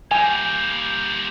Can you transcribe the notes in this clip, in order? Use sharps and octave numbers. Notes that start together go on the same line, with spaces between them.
G3 A#3 G#5 G6